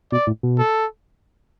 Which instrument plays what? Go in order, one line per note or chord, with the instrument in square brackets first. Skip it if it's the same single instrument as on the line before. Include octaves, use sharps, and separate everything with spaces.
[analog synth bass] B2 [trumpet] D5
[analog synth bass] A2
B2
[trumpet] A4